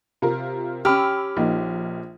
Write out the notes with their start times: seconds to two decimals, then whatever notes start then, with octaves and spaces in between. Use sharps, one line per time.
0.22 C3 F4 A#4
0.85 C#4 G4 B5 E6 F6
1.37 A#1 A#3 D#4